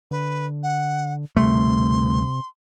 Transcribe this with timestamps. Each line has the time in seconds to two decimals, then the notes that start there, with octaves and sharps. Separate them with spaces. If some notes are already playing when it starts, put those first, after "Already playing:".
0.11 D3 B4
0.63 F#5
1.37 D2 C3 G3 A3 C6